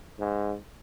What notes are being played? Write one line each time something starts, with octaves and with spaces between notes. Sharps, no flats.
G#2